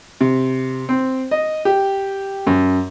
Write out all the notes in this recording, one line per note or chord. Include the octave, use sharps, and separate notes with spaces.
C3
C4
D#5
G4
F#2